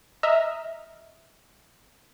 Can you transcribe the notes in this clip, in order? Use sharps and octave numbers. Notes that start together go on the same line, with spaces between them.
D#5 E5 A#5 F6